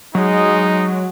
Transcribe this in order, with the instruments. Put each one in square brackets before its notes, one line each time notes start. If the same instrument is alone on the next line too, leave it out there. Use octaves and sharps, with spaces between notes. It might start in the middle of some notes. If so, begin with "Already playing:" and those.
[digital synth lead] F#3 [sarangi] G#3 [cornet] D#4